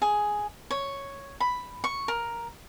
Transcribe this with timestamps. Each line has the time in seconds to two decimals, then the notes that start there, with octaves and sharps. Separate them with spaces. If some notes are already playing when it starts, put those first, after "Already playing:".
0.02 G#4
0.71 C#5
1.40 B5
1.84 C#6
2.08 A#4